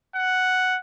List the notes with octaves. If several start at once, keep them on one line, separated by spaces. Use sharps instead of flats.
F#5